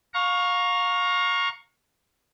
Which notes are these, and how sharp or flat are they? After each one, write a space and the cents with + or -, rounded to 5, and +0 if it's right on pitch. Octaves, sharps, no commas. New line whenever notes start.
F5 +30 A#5 +0 C#6 +0